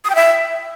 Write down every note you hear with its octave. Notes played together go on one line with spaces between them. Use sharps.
D#6
G5
E5